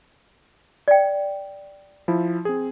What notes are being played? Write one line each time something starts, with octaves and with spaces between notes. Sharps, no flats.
D5 G5
F3 E4
C4 G#4